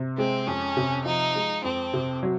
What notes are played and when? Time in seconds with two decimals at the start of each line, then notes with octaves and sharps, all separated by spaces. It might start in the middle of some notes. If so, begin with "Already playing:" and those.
Already playing: C3
0.18 G#3 C4
0.47 F2 C#4
0.77 C3
1.06 F3 D#4
1.35 G#3
1.64 F2 C4
1.94 C3
2.23 F#3